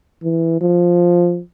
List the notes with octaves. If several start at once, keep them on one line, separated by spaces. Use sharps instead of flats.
E3
F3